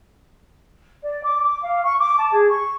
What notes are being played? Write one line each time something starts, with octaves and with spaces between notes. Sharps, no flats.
D5
D6
D6
F5
C#6
D6
A5
G#4
C#6